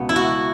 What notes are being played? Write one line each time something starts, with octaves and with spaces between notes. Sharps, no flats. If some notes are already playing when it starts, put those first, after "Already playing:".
Already playing: C#2 B2 B3
E4
F#4